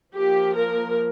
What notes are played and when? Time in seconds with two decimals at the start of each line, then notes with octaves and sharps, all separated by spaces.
0.16 F3 A#3 G4
0.59 A#4